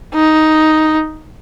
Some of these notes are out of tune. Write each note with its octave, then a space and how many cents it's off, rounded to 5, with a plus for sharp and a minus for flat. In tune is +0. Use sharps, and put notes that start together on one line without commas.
D#4 +5